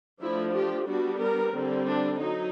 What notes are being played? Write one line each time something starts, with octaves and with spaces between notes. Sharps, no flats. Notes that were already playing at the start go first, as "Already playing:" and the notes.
F3 A3 D4 E4
G4
G3 B3 D4 F#4
A#4
D3 G3 C4
D4
F#3 D#4